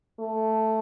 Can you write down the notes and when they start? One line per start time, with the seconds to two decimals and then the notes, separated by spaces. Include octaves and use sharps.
0.19 A3